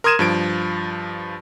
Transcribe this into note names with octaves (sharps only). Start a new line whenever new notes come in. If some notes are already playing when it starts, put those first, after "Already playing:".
A#4 C6 D#6 G#6 D#7 E7
G2 F3 D7